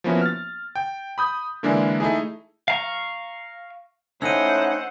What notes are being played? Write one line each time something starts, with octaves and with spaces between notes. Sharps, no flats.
F3 A#3 B3 C#4 E4 F#4
F6 A6
G5
B5 D#6 G6
D3 E3 G#3 A#3 D4 E4
A3 D#4 E4 G#4
F5 A#5 C#6
A2 C#4 D#4 C5 F#5 E6 D#7